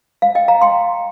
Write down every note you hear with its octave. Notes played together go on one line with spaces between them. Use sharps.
F5
D#5 G5
F5 A#5
G5 C6